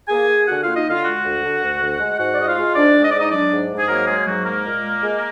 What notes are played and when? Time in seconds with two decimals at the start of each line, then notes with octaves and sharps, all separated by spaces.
0.08 A#3 G#4 G#5
0.29 A#3
0.43 G#5
0.48 D3 F#4 F#5
0.62 A#3 F4 F5
0.76 D#4 D#5
0.86 D3 F4 F5
1.05 G#3 F#4 F#5
1.24 D2
1.43 D3
1.62 D2
1.80 D2
1.99 G#3
2.18 G#2 F#4 F#5
2.31 D5
2.37 G#2 D#5
2.46 F4 F5
2.56 G#3
2.75 G#2 D4 D5
2.94 G#2
3.04 D#5
3.11 G#2 D5
3.19 D#4 D#5
3.31 F#3 D4 D5
3.51 G#2
3.70 G#2
3.79 G#4
3.88 F#3 A#3 A#4
4.07 G#3 A#3 G#4
4.26 G#2 F#3 F#4
4.45 G#3 A#3 A#4
4.64 A#2
4.83 G#3
5.02 G#3